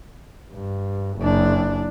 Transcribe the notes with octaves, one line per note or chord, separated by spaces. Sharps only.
G2
F#1 D4